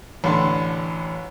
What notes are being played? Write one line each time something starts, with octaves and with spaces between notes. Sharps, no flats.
A1 A2 D3 A5 C6